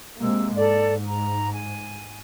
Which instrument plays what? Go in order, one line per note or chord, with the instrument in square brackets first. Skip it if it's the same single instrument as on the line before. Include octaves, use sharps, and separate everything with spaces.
[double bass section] C3 G#3 A#3 [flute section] E6
[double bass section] G#2 [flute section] A4 D5
[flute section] A#5
G#5